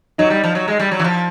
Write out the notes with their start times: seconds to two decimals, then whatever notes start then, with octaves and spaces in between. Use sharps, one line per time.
0.18 F#3 D#4
0.30 G3
0.44 F3
0.55 F#3
0.68 G#3
0.79 G3
0.91 F#3
1.00 E3
1.04 F3